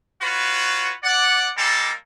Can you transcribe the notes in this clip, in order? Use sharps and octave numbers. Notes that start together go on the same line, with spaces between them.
F4 F#4 B4 C#5
D5 F#5
G3 G#3 A#3 A4